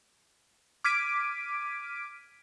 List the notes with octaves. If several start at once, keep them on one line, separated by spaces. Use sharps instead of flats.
D6 F6 G#6 B6 D7 D#7